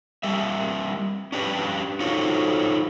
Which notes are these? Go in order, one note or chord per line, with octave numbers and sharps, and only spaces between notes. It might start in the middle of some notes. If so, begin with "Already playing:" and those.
G3 A#3 E5
C#4 D4 G4 B4
D#4 F4 F#4 A4 C5 C#5